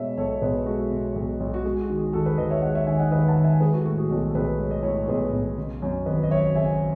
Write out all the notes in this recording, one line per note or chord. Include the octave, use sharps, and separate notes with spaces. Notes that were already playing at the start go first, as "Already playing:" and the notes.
Already playing: B2 G#3 C#5 E5
B1 A4 C#5
B1 G#4 B4
G#3 F#4 A4
B2
B1
B1
F#4
G#3 G#4
F#4
D#3
G#4
D#2 F#4 A4
G#4 B4
D#2 B4 D#5
C#5 E5
G#3 D#5 F#5
C#5 E5
D#3 E5 G#5
D#5 F#5
D#2 B4 D#5
F#5 A5
D#2
E5 G#5
G#3 G#4 B4
F#4 A4
A2 F#4
G#4
B1 F#4 A4
A4
B1 G#4 B4
G#3 C#5
D#5
A2 A4 C#5
B1 G#4 B4
B1
C#3
F#2
G#1 B4 D#5
D#5
F#3 C#5 E5
C#3 E5 G#5